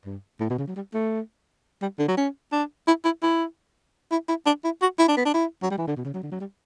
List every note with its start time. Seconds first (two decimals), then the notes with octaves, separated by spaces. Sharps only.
0.06 G2
0.40 A2
0.50 B2
0.58 C#3
0.68 F#3
0.76 G3
0.94 A3
1.82 G3
1.99 D3
2.08 F#3
2.17 C#4
2.52 D4
2.87 E4
3.05 E4
3.23 E4
4.12 E4
4.29 E4
4.46 D4
4.64 E4
4.82 F#4
4.99 E4
5.08 D4
5.17 B3
5.25 D4
5.34 E4
5.63 F#3
5.71 G3
5.78 E3
5.88 D3
5.97 B2
6.05 C#3
6.14 F#3
6.23 D3
6.31 F#3
6.40 G3